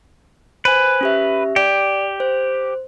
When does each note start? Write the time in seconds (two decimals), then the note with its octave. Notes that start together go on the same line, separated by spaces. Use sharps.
0.65 B4 C5 G#5
1.01 C#4 G4 E5
1.56 G4 D5
2.20 C5